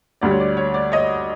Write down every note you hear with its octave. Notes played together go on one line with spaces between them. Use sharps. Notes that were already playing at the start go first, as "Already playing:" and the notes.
D2 D3 G3 D5
C#5
D5
C#5
D5
C#5 D#5